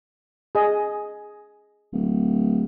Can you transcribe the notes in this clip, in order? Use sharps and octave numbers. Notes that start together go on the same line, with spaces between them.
G#4 D#5
D1